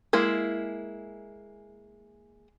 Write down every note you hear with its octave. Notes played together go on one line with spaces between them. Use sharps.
G#3 A#3 E4